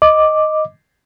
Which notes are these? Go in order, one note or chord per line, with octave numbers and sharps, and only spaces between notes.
D#5 D6